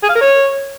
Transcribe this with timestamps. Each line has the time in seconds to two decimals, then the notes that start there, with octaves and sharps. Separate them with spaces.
0.03 G#4
0.09 F5
0.15 A#4
0.21 C#5